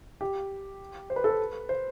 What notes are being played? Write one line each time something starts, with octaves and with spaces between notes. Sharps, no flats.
G4
C5
B4
A4
B4
C5